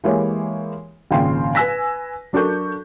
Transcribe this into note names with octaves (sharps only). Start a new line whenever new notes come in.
E3 G#3 A#3 E4 G4 C#5
G#1 A#2 C#3 F3 G5 C6
B4 G#5 E6 A#6 B6
F#3 D4 A4 A#4 C#6 G6